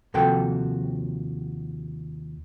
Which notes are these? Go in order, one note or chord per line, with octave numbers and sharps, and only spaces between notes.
D#2 C3 F3 F#4 A4 G5